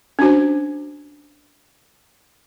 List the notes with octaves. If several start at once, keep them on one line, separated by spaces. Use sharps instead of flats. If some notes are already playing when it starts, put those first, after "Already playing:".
C#4 D4 F#4 C5